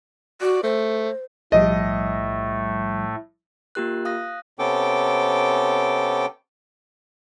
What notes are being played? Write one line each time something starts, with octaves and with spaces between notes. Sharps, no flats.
F#4 D5
A3 C5
B1 A2 F3 G3 A3 D#5
A#3 F4 G4 A#4 F#6
F5 D#6 F#6 A#6
C3 B3 C#4 A4 G5 D6